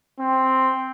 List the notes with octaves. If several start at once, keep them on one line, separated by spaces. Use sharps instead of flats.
C4